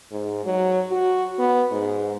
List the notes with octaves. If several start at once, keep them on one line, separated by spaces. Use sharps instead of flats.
G#2
F#3
F#4
B3
G#2